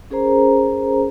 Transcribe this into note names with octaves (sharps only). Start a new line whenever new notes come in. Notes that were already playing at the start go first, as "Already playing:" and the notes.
C#4 G#4 A#4 C5 A#5